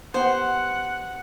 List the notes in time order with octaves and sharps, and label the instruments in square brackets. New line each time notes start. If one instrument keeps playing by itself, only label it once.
[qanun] B3 G4 [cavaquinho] C5 [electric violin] F#5